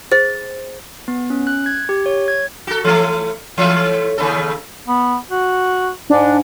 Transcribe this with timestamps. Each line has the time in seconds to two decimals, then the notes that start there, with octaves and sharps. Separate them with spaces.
0.12 G#4 C5 A6
1.08 B3
1.30 C#4
1.47 F#6
1.66 G#6
1.89 G4
2.06 C#5
2.28 G#6
2.67 F#4 A4
2.84 E3 A3
3.58 E3 A3 C#5
4.18 D#2 C#3 A4
4.88 B3
5.30 F#4
6.10 G#2 D4